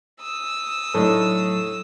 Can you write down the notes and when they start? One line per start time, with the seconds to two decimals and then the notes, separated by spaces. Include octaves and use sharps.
0.20 D#6 E6
0.94 A2 F#3 A3 D4 D#4